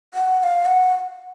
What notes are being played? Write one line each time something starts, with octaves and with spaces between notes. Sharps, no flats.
F#5
F#5
F5
F#5